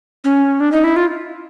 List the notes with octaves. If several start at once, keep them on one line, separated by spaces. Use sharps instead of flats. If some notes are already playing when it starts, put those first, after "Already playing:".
C#4
D4
D#4
E4
F4